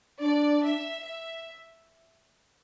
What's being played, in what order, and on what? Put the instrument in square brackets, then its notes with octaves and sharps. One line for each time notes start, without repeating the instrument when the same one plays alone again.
[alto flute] D4 [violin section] D5
[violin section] E5
E5